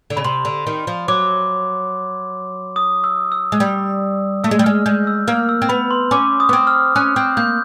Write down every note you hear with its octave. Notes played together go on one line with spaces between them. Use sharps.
D3
C#3 B5
C3 C6
D3
D#3
F3
F#3 D6
D#6
E6
E6
G#3
G3
A3 E6
G#3
G3
G#3 F6
G#3 G6
E6
A#3 F6
E6
C4
B3 B5
C6
C#4 D6
D#6
B3
C4
F6
C#4 F#6
C4 G6
A#3 G6